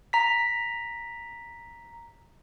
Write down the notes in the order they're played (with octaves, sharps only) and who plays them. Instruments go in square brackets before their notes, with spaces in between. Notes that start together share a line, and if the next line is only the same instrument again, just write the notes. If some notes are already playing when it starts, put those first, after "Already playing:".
[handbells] A#5 B6